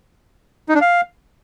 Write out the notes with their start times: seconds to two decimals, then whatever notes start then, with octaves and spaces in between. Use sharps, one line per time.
0.69 D#4
0.75 D4
0.81 F5